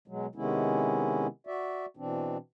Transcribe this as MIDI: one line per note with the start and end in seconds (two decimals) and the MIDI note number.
0.08 0.27 47
0.08 0.27 54
0.08 0.27 56
0.35 1.27 48
0.35 1.27 51
0.35 1.27 56
0.35 1.27 59
0.35 1.27 61
0.35 1.27 64
1.47 1.86 66
1.47 1.86 74
1.47 1.86 76
1.97 2.37 47
1.97 2.37 52
1.97 2.37 60
1.97 2.37 62